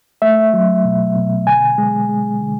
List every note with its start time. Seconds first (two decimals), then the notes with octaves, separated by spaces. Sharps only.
0.22 A3 E5
0.54 F#3
0.85 B2
1.15 B2
1.47 D3 G#5
1.78 G#3
2.09 G#3
2.41 D3